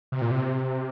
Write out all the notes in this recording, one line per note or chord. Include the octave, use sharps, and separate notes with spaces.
C3
A#2
C3